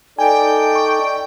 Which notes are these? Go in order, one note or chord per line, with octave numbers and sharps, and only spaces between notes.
D#4 A4 D5 G5 G#5
C#6